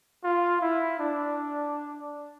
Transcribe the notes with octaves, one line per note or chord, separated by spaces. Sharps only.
F4
E4
D4